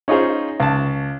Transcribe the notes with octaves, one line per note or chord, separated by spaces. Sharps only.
C#4 D#4 F4 G#4 C5
C#2 A5